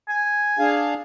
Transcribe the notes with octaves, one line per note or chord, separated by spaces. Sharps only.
G#5
D4 G#4 F5